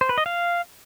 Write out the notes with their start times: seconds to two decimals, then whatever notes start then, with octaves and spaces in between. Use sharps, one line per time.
0.01 C5
0.09 B4
0.18 D#5
0.26 F5